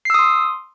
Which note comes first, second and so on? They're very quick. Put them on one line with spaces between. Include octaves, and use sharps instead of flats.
C7 E6 D#6 C6